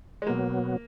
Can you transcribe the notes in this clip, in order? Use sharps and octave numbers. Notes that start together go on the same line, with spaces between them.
G#3
B2 F#3 A#3 B3